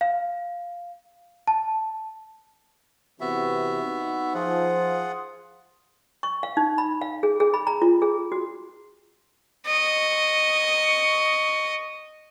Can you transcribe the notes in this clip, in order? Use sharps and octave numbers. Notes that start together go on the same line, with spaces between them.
F5
A5
C3 E3 B3 F#4 E5
D#4
F3 F4 G#4 F#5
C#6
F5
D#4
B5
F5
G#4
G#4
B5
A#5
F4
G#4
F#4
D#5 C#6